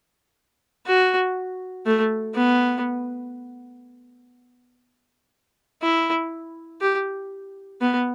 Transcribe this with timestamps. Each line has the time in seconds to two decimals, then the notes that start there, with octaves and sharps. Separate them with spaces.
0.86 F#4
1.86 A3
2.35 B3
5.82 E4
6.81 G4
7.81 B3